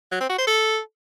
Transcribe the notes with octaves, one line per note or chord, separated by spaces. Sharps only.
F#3
C4
F#4
C5
A4